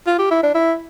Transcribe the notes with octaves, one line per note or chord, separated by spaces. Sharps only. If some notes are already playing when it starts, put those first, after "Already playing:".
F4
G4
E4
D4
E4